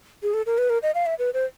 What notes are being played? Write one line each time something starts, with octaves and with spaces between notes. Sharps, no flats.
G#4
A4
A#4
B4
A#4
D#5
F5
E5
B4
C5